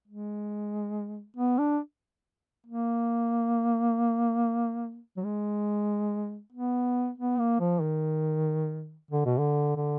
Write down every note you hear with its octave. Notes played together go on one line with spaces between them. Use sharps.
G#3
B3
D4
A#3
F#3
G#3
B3
B3
A#3
F3
D#3
D3
B2
D3
D3